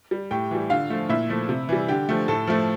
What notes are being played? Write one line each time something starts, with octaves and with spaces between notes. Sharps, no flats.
G3
A2 G4 G5
E3 G3
D3 F4 F5
F3 A3
A#2 E4 E5
F3 A3
C3
E3 G3
D3 G4 G5
F3 A3
A2 A4 A5
F3 A3